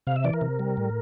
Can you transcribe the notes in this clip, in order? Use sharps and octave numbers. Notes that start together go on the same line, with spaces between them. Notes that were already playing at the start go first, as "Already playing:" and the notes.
C3 F5
E5
E3 D5
A#4
C3
G3
A2